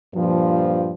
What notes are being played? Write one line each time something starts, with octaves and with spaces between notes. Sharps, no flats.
G2 A#2 F3